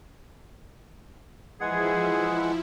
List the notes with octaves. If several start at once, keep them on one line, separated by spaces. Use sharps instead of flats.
E3 F3 G#3 E4 G#4 F#5